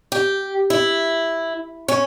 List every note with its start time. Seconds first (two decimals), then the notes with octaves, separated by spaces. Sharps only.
0.12 G4
0.70 E4
1.88 C#4